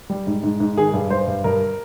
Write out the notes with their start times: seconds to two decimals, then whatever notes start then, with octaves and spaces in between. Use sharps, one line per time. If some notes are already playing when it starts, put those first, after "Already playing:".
0.10 G3
0.27 G#2
0.43 G#2
0.60 G#2
0.77 D#3 G#4
0.94 G2
1.10 G2 C5
1.27 G2
1.44 G2 A#4